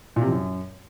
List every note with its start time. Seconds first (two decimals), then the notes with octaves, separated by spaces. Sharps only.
0.16 A#2
0.21 C3
0.27 F3
0.32 F#2